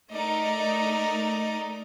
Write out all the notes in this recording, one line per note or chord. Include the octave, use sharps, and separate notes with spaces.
A3 D#4 A#4 D5 D#5